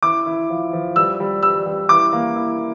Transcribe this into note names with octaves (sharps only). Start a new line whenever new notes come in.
E4 D6
E4
F3
F3
G3 E6
G3
G3 E6
G3
E4 D6
A#3
E4